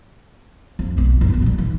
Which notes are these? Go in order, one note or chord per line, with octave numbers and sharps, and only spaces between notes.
F2
B1 A3
G2 D4
E2 D3
A#2 G3
G#2 E3